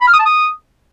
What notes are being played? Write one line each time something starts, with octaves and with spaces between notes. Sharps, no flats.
B5
F6
D#6
A5
D#6